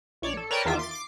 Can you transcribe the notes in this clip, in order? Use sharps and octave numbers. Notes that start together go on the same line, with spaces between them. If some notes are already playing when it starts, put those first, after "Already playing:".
A#1 C#5 D5
A4
A#4 B4 C#5 D5 G5 A5
E2 D#3 F4 E5 D6
C6 D6 A6
D6 C7